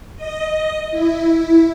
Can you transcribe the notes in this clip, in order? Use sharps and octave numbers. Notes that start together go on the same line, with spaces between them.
D#5
E4